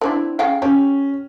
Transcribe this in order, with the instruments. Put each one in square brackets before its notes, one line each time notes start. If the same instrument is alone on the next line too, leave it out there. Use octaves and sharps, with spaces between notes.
[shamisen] C4 D4 E4
C#3 F5 G5
[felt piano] C#4 [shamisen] G4